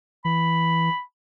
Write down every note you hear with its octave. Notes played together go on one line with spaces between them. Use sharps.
E3 B5